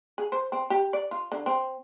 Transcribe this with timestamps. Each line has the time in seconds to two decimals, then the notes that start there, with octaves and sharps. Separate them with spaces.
0.18 G#4
0.32 C5
0.52 C4
0.70 G4
0.93 D5
1.11 F4
1.32 D3
1.46 C4